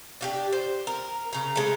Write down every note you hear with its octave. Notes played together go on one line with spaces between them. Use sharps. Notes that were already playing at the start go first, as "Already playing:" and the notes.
D4 F#4 G4
C5
A#4
C#3 A#5
G#3 A3